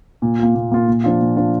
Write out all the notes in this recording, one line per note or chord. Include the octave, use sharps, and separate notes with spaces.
A#2
A#3 F4
A#2
A#3 F4
A#2
F3 D4 F4
A#2
F3 D4 F4